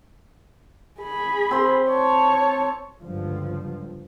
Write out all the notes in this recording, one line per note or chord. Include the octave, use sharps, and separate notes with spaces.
G#4 B5
C4 C6
C#5 A5
G1 C#2 G2 D3 F3 F#3